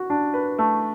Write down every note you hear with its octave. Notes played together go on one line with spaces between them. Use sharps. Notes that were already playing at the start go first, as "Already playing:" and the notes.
Already playing: F#4
D4
B4
A3